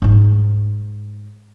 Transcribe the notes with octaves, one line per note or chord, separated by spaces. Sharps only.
G#2 D#4